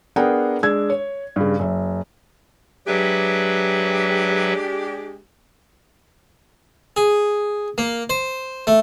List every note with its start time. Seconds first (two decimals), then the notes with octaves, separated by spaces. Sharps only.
0.16 B3 D4 G#4 A#4 F#5 G5
0.63 G#3 D4 E6 G#6
0.90 C#5
1.36 G2 C#3
1.59 F#1 E5
2.87 F#3 G#3 D4 G4 B4 E5
6.97 G#4
7.78 A#3
8.10 C5
8.67 A3